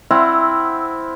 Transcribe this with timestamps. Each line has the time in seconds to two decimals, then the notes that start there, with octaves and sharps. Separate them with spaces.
0.11 C4 E4 F5 F#5